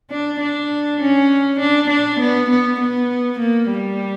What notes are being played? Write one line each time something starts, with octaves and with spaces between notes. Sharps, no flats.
D4
D4
C#4
D4
D4
B3
B3
B3
A#3
G3